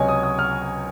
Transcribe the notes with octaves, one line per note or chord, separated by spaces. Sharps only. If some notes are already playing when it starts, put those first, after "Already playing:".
Already playing: C#2 C3 F#3 C4 C#5 D#5 G#5
D#6
D#6
F6